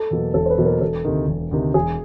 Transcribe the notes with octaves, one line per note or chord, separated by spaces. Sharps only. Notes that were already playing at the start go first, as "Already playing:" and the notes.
Already playing: A4
E2 B2 F#3 A#3
E1 A4
C5
B4
E2 B2 F#3 A#3
A#4
E1 A4
D2 C3 D#3
E1
D2 C3 D#3
E1 G#4